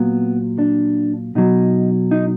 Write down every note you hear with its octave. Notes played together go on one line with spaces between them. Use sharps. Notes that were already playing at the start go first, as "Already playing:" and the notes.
Already playing: A#2 F#3 B3
D4
B2 F#3 D#4
D#4